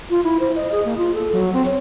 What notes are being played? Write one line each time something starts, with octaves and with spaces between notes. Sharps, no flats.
F4
E4
C5
D#5
G#4
A#3
F4
A4
F#3
C4
C#5